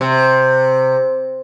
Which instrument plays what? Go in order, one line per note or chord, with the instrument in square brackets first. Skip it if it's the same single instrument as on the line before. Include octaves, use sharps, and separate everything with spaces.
[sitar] C3